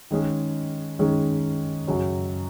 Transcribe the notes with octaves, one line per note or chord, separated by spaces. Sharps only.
D#3 G#3 C#4 G#4
D#3 G#3 C#4 G#4
F#2 C#3 F#3 C#4